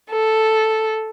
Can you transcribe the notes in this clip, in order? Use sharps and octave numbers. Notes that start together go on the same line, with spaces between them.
A4